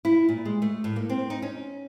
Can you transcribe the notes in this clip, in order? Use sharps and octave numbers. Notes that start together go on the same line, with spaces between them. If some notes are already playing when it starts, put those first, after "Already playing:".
E4
A#2
G#3
A3
A2
A#3
C4
D#4
C#4